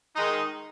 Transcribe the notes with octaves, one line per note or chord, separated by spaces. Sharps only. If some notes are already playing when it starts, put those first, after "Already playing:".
D#3 G#3 D#4